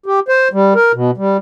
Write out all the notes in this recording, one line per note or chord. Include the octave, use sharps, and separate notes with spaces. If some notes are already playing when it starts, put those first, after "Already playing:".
G4
C5
G3
A#4
B2
G3